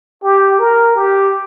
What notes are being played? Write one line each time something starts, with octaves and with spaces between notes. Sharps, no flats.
G4
A#4
G4